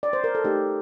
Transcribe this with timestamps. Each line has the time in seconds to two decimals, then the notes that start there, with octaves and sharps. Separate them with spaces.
0.03 D5
0.13 C5
0.24 A#4
0.35 A4
0.44 A3 D#4 G4